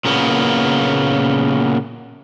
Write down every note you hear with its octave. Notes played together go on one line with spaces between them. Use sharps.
A#2 C#3 A#3 B3